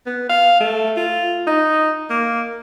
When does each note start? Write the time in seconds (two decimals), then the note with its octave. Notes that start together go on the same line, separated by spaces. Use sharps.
0.06 B3
0.29 F5
0.60 A3
0.97 F4
1.47 D#4
2.10 A#3